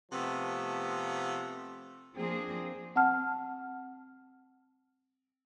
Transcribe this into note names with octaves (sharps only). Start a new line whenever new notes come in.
C3 F3 A3 B3
F3 A#3 C4 D4 G#4
C4 F#5 A5 F6